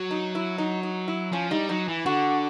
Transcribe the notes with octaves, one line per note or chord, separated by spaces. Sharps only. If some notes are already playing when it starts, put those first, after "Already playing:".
Already playing: F#3
D#4
E4
D#4
D#4
E4
F3 C#4
G3 D#4
F#3 D#4
E3
D3 F#4